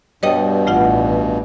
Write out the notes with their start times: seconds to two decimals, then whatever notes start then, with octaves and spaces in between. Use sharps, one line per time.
0.23 G2 B2 G3 B4 C#5 D#5 G5
0.67 A1 E3 A3 F4 F#5